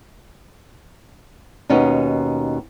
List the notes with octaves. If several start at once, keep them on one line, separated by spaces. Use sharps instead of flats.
D#2 B2 C#4 D#4